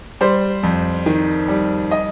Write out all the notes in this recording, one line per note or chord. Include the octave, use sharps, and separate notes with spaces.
G3 C5
F2
D#3
G3
D#5